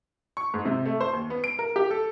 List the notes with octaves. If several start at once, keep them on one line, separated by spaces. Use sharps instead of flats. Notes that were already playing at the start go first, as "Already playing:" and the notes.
C#6
G#2
C3
A3
C5
D#2
B3
D7
A#4
G4
A4